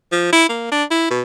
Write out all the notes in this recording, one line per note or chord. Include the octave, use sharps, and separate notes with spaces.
F3
E4
A#3
D4
E4
B2